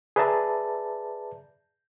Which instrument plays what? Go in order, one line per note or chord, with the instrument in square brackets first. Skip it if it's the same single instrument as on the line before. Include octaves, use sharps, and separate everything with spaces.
[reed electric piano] G#4 B4 D5 E5 A5 A#5